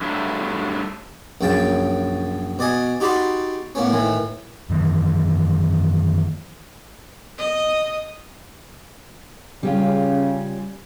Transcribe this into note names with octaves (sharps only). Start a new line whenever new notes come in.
G2 F#3 A3 D4 E4
A#1 F#2 C#3 G5 A5
B2 D5 D#5 G#5
D#4 F#4 G4 D5 B5 C6
A2 A#3 B3 C#4
A2 D#3 E3
F#2 D#3 E3
D#5
C#3 G3 C#4 F4